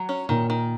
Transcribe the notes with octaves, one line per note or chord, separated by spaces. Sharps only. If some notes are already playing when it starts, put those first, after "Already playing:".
Already playing: F#3
C#4
A#2 D#3
D#3